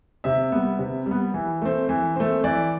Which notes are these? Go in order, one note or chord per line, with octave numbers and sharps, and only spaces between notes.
C3 E5
G3 B3
C3
G3
B3
E3
A3 C4
E3
A3 C4
E3 D5